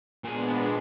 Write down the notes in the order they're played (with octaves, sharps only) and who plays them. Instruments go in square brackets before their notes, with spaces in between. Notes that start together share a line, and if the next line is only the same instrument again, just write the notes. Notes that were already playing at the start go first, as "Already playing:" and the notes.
[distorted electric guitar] A#2 G#4 [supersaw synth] G#3 B3 D4